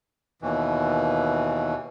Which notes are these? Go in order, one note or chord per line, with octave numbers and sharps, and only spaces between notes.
D#2 B2 E3